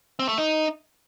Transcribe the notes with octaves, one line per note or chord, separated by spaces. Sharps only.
C4
A3
D#4